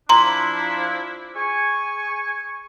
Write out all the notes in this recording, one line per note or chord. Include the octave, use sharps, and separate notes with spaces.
F3 D4 E4 A#5 C6
G#4 G#5 C#6